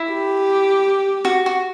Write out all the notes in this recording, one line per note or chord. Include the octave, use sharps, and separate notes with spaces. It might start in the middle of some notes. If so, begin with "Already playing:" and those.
Already playing: E4
G4
F#4
F#4